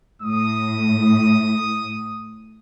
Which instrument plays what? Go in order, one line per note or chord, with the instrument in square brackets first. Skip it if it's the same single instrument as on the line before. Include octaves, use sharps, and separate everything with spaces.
[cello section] A2 [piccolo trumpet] D#6